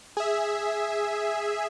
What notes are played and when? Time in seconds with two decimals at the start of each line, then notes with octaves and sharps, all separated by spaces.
0.17 G#4 E5